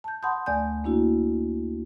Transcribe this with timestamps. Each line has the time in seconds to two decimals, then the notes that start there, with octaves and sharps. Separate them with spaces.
0.04 A5 G6
0.23 F#5 A5 B5 C6 D#6 G6
0.46 D2 A3 D5 G#5 G6
0.84 A#3 D4 E4 F#4